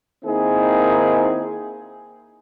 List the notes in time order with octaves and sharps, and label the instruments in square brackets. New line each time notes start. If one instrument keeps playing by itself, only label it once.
[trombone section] D#3 A#3 C4 D#4 E4 G#4